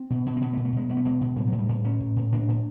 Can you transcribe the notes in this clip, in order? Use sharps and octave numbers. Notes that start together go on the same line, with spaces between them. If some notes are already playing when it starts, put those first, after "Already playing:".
Already playing: C4
B2
B2
C4
B2 B3
A3
B2
A3
B2 G#3
B2 G#3
A3
B2 G#3
B2
A2 G3
F#3
A2
G3
A2
A2 C#4
A2
A2
A2 D4
A2